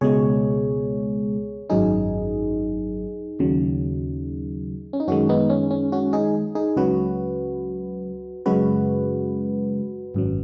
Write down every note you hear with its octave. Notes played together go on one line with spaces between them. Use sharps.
C#2 B2 G#3 G#4 C#5
G#1 F#2 F#3 D#4 G#4
D#2 C#3 F#3
C#4
D#4
F#2 D#3 G#3 C#4 F#4
B3 D#4
C#4
C#4
C#4 F#4
D#4 G#4
D#4 G#4
C#2 C#3 F#3 F#4 B4
F#2 C#3 G#3 F#4 B4
G#1 F#2 F#3